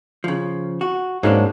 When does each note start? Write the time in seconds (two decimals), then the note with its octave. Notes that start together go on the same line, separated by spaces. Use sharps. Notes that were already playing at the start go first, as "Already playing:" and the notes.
0.24 C#3 F3
0.81 F#4
1.23 G#2 F#3 G#3 A#3 C#4 D4